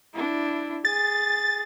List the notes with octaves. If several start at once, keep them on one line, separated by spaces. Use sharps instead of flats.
D4 E4
G#4 A6